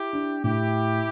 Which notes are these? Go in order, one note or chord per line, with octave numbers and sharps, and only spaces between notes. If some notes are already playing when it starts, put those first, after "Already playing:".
Already playing: E4 G4
D4
A2 E4 G4